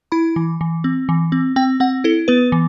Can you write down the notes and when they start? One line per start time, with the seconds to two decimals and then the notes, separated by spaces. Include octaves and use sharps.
0.12 E4 B5
0.36 E3
0.61 E3
0.84 C4
1.09 E3
1.32 C4
1.56 C4 G5
1.80 C4 F#5
2.04 E4 A4
2.28 B3 B4
2.52 E3